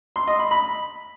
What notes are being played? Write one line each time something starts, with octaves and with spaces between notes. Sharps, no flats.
C6
D#5
B5
B5